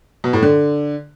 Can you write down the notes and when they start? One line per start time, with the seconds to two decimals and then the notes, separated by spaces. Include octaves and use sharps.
0.24 B2
0.33 A2
0.42 D3